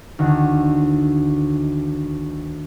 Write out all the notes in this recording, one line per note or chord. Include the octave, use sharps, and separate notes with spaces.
D2 D#3